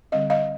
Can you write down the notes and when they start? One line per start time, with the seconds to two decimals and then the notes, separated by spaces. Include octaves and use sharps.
0.12 D3 G3 C4 D#5 F5
0.30 D#5 F5